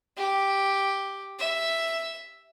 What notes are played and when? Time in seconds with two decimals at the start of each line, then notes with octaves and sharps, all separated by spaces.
0.17 G4
1.39 E5